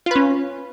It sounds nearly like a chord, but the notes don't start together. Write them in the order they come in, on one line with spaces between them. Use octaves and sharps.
F4 B4 C#4